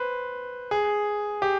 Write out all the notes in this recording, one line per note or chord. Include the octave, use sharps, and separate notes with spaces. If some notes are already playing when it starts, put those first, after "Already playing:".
Already playing: B4 C5
G#4
G4